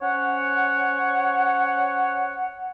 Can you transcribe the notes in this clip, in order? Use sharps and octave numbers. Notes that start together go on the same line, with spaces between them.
C#4 C5 C#5 F#5